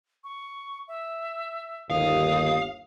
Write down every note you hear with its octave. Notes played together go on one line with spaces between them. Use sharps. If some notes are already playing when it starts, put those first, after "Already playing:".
C#6
E5
G1 D#2 F5 D#6